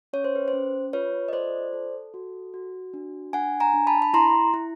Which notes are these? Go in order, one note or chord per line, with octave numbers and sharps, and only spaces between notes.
C#4 C#5
C5
B4
C5
C#4
F4 B4 C#5
D#5
A4 C5 D5
A4
F#4
F#4
D4
D4 F#5 G#5
G#5 A#5
D4
A5 B5
B5
E4 A#5 C6
E4